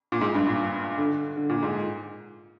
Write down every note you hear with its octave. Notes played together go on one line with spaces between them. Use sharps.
A#2
G#2
G2
A#2
D3
D3
A#2
G#2